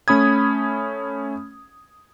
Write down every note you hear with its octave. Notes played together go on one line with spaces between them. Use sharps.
A3 C#4 B5 D#6 G#6